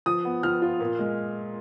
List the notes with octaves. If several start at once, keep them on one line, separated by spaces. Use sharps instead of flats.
F3 D#6
B3
F3 F6
F4
A#2
G#3